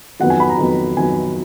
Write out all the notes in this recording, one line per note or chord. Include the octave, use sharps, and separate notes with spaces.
F2 D#3 F#3 B3 F#5
G#5
B5
A#5
F2 D#3 F#3 B3
F2 D#3 F#3 B3 G#5